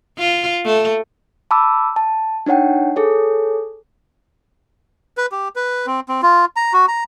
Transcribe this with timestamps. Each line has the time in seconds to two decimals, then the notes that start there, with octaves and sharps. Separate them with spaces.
0.18 F4
0.65 A3
1.51 A5 B5 D6 E6
1.96 A5
2.46 D4 D#4 C#5 F#5 G5
2.96 G#4 A4 C#5
5.17 B4
5.32 G4
5.56 B4
5.87 C4
6.09 C4
6.23 F4
6.56 A#5
6.73 F#4
6.88 A#5